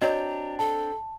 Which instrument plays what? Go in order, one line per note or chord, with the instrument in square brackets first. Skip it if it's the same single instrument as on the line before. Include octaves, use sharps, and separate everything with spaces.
[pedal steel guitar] C4 D4 G4 [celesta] F#4 [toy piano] C#5 D#5 [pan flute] A#5
[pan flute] A4 [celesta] A5